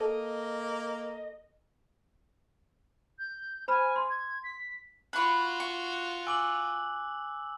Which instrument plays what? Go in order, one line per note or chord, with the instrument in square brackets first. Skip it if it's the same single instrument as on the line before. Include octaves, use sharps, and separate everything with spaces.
[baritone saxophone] A#3 [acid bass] A4 [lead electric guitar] D#5
[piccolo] G6
[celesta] C5 B5 F6 [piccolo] G#5
[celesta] C6
[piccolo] G#6
B6
[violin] F4 F#4 [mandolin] B5 C#6 [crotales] F#6 F#7
[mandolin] C#6
[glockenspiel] G#5 D6 F#7 [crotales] E6